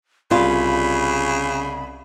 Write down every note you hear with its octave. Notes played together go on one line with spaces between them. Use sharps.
C2 C#3 G3 F4 B5